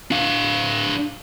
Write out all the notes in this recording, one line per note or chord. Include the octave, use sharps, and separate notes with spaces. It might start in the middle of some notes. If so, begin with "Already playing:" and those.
D4 F5